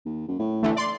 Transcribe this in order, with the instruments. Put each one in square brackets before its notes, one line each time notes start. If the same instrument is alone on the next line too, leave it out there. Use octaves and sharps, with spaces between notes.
[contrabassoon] D#2
F#2
A2
[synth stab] D3 E3 A3
D5 C6